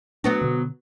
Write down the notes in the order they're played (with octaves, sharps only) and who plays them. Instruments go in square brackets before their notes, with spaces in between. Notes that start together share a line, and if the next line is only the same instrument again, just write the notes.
[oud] F#3 B3 F#4 [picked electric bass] A3 D4
[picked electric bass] B2 D3